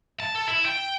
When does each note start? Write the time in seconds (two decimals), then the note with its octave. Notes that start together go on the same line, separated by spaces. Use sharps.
0.20 A5
0.35 A4
0.48 E4
0.66 G5